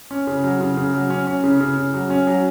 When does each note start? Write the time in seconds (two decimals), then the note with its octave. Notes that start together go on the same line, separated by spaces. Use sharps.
0.11 C#4
0.27 C#3
0.44 F#3
0.61 C#3
0.77 C#3
0.94 F#3
1.10 C#4
1.27 C#4
1.44 C#3
1.60 C#3
1.77 C#3
1.94 F#3
2.10 C#4
2.27 F#3